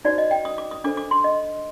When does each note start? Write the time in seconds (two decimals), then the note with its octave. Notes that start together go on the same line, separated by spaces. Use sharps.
0.05 D#4 F#4 C5 D5
0.18 D#5
0.31 G5
0.45 D#6
0.58 D6
0.71 D#6
0.84 D4 A4 C5 D6
0.97 D6
1.11 C6
1.24 D#5